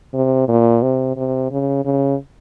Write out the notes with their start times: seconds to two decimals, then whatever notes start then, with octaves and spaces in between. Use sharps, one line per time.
0.14 C3
0.48 A#2
0.82 C3
1.16 C3
1.51 C#3
1.85 C#3